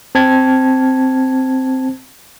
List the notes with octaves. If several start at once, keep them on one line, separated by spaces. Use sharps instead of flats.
C4 A5 G#6